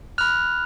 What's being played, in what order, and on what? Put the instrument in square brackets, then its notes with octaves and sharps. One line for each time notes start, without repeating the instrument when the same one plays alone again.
[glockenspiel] B5 F6 F#6 F7